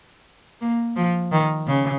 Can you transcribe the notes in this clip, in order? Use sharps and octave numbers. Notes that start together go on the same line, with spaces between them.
A#3
F3
D#3
C#3